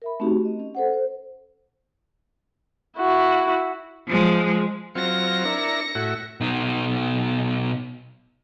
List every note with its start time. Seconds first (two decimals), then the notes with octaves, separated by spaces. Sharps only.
0.02 A#4 E5 B5
0.20 A3 C4 C#4 D#4 F#4 G4
0.45 D#5
0.60 C#4
0.75 A4 C5 F#5
0.93 C5
2.98 E4 F#4
4.08 F3 G#3
4.95 F#3 C4 F4 A#6 C#7
5.45 D4 E4 A#4
5.95 A2 E4 F#4
6.41 B2 D#4